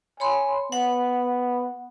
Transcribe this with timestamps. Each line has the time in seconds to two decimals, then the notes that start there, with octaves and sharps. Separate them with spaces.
0.20 C#5 G#5 B5 C6
0.72 B3 F#5